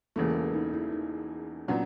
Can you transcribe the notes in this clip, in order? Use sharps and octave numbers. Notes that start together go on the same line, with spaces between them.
E1 E2 C#3 E3 A3 A#3
B3
D#4
E4
D#4
A#2 F#3 B3 C#4 D4